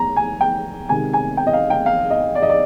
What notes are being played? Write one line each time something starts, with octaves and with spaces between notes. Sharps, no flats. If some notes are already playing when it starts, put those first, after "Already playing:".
Already playing: A#5
G#5
G5
C3 D#3 G#3 G#5
G#5
G5
D#5
F5
G5
F5
D#5
D5
D#5
D5